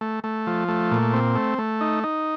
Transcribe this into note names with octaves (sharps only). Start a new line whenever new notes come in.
A3
A3
F3
A3
A#2
C4
A3
A3
D#4
D#4